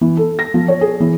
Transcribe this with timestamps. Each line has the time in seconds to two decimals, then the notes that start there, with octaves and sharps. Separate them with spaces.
0.01 E3
0.17 A4
0.39 A#6
0.54 F3
0.68 C#5
0.81 G#4
1.00 E3